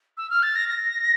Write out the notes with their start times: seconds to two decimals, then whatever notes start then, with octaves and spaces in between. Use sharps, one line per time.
0.17 E6
0.30 F6
0.43 A6
0.55 A#6
0.69 A#6